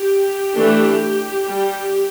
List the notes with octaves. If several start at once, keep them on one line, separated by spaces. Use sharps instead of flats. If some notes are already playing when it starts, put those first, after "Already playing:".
Already playing: G4
E3 A3 D4
G3